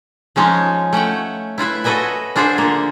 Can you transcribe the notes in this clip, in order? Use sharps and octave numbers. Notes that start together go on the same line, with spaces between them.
F3 G#3 C#4 D#4 F4
A3 C#4 F#5 G5
E4 F4 B4 E5
F#4 A4 B4 D#5 E5 G#5
D4 F4 G#4 C5 E5 F#5
D3 A#3